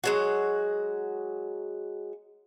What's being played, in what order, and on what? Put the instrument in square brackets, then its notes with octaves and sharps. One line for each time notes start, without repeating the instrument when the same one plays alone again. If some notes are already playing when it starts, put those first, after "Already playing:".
[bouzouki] F#3 G#3 F#4